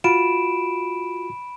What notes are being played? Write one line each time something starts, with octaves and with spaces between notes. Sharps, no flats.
F4 F#4 B5 D7 E7